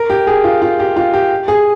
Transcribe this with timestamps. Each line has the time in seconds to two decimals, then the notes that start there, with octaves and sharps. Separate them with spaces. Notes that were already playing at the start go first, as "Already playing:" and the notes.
Already playing: A#4
0.10 G4
0.27 G#4
0.44 F4
0.62 F4
0.79 G4
0.96 F4
1.14 G4
1.48 G#4